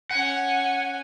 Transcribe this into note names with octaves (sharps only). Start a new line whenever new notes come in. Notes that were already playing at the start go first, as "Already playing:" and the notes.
C#4 F#5 G#5